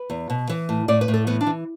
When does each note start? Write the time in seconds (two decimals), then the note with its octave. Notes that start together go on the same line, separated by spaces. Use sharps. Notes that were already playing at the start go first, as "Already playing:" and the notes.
Already playing: B4
0.10 E2
0.30 B2
0.49 E3
0.69 A2
0.88 A2 D5
1.01 B4
1.08 A2
1.14 A4
1.27 E3 B3
1.41 D4
1.47 E3